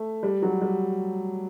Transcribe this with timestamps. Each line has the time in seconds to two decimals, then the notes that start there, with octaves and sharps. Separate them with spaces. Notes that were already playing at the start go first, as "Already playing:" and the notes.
Already playing: A3
0.23 G3
0.42 F#3
0.61 G3